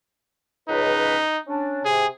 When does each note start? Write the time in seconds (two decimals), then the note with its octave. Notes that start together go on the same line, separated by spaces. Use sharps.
0.69 C#2 D#4 B4
1.47 C#4 D4
1.85 C3 G#4